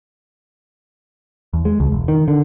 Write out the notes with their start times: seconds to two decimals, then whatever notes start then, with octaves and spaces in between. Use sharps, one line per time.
1.53 E2
1.65 G#3
1.80 C#2
1.92 E1
2.08 D#3
2.28 D3